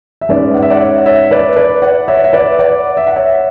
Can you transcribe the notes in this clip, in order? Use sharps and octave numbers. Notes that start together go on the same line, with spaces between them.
E5
G#2 G#3 C#4 B4 D5
F#5
E5
D5 F#5
C#5 E5
C#5 E5
B4 D5
B4 D5
D5 F#5
C#5 E5
E5
B4 D5
D5 F#5
E5
F#5
C#5 E5